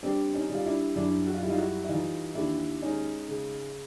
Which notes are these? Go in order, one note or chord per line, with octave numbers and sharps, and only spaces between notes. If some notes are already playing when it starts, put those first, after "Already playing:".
G3 C4 D4
C#4 D#4
G3
F4
D4 E4
F#2 D4 E4
F#4
F4
G3 E4
D#4 F4
E4 F#4
E4
E3 D#4 F4
D#2 D4 E4
G#3 C#4 D#4
C#3